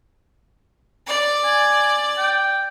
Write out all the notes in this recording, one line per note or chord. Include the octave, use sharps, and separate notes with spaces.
D5
G#5
G5